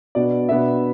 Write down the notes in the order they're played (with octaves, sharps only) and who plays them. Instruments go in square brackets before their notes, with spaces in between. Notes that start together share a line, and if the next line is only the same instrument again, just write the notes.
[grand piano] B2 B3 D4 D5
B2 B3 D4 E5